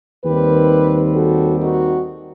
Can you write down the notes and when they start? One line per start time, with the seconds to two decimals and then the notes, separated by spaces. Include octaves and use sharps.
0.24 D#2 D#3 G3 C4 G4 B4
1.14 F#4 A4
1.59 D#4 F#4